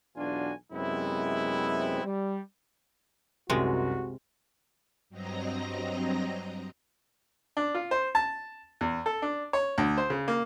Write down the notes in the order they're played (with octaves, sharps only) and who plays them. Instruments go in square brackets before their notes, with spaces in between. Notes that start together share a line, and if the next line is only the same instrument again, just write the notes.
[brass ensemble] B1 E2 D4 F4 F#4 G#5
F#2 C3 G#3 B3 C4 E4
G3
[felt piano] C2 F#2 A#4 [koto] C3 G#3 [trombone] F#4
[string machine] G2 F#3 C4 D#5 A#5 A#6
[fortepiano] D4
F4
C5
A5
E2
A4
D4
C#5
D2
C5
C#3
A#3